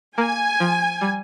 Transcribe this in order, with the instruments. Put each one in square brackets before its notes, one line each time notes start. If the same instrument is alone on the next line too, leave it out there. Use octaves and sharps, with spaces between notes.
[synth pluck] A#3 [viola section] G#5
[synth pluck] F3
G3